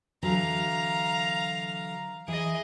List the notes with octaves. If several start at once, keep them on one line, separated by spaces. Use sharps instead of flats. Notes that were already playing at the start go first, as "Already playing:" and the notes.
D3 E3 F#3 F5 A#5
E3 G#4 D#5